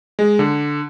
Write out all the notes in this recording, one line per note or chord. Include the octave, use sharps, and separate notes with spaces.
G#3
D3